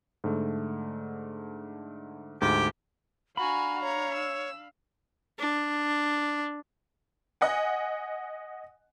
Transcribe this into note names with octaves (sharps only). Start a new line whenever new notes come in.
G#2 D3 A3
D2 G#2 G4
D4 F#4 F5 G#5 A#5 B5
C#5 A#5
E6
D4
D#5 F#5 G#5